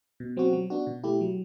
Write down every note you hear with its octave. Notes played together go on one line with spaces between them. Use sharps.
B2
F#3 C4 F#4
F#3
B3 D4 F#4
B2
A3 E4 G4
F#3